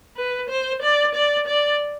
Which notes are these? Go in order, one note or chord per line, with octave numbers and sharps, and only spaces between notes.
B4
C5
D5
D5
D5